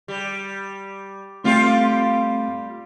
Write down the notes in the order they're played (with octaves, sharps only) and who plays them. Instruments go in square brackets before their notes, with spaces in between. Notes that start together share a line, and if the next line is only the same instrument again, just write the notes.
[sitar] G3
[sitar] G3 F4 G4 [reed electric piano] A3 C4